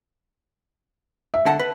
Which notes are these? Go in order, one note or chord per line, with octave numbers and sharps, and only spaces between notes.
E5
D3 F#5 A5
B4